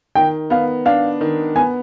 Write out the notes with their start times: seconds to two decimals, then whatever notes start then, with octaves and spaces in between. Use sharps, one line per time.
0.15 D#3 G5
0.50 B3 F5
0.86 D4 F5
1.21 D#3
1.56 B3 G#5